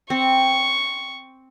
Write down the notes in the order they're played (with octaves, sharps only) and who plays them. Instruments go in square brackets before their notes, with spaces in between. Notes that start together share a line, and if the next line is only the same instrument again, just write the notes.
[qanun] C4 [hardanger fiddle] C#6